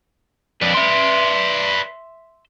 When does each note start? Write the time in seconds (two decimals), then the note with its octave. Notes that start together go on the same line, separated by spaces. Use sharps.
0.62 F2 D4 B4 D5
0.75 E5 C6